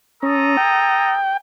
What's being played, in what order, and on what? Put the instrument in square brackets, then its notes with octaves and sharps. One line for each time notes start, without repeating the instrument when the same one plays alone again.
[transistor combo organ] C#4 [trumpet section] A4 A#5 D#6
[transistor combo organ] G5